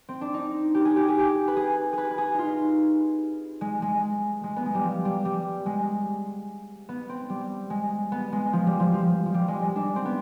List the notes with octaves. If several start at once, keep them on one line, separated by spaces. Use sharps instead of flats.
C4
D4
D#4
G4
G#4
G4
G#4
G4
B4
G#4
G#4 B4
B4
G#4
D#4 F4
G#3
G#3
G#3
B3
G#3
G3
F3
G3
G3
G#3
B3
C4
G3
G#3
B3
G#3
F3
G3
F3
F3
F3
G3
G#3
G#3
D4
C4
B3